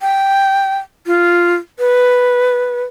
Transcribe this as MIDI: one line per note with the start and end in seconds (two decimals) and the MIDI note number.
0.01 0.78 79
1.07 1.54 65
1.79 2.82 71